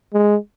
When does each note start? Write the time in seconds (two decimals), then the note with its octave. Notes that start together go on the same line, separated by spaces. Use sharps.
0.13 G#3